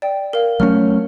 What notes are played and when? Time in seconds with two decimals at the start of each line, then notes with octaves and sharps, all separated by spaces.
0.02 D5 G5
0.33 A#4 F5
0.60 F#3 A3 C#4 F6